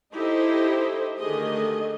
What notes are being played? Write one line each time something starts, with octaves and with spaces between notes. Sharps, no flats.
D#4 E4 G4 A4 C5 D#5
D3 D#3 A3 G4 G#4 D#5